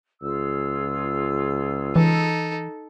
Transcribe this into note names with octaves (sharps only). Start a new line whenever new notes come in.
C#2 F4 G#4 E6
E3 D#4 A4